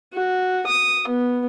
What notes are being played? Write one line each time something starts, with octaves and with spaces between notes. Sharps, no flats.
F#4
D#6
B3